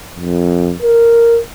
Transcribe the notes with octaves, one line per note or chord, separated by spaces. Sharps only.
F2
A#4